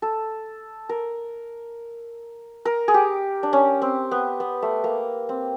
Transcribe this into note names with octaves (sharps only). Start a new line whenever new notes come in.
A4
A#4
A#4
G#4
G4
D4
C#4
C4
B3
B3
A3
A#3
C4